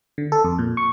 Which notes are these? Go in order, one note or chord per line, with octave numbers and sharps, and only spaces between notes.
D3
A4
F2
A#2
C#6